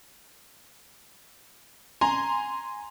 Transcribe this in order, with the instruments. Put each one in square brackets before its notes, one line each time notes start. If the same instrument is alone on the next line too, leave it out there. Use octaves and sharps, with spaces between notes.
[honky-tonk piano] G#5 A#5 C6